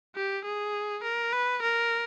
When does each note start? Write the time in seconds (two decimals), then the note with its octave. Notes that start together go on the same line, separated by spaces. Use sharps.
0.16 G4
0.45 G#4
1.03 A#4
1.33 B4
1.62 A#4